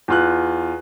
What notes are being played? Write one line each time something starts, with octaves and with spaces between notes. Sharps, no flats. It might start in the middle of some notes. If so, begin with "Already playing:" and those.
E2 F4 F#6